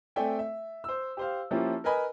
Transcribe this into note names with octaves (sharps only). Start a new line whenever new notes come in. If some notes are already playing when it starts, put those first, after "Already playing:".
A3 C4 D5 E5 G5 G#5
E5
C5 E6
G4 C5 F5
F3 A#3 C#4 E4 F4 G4
A#4 B4 D#5 G#5 B5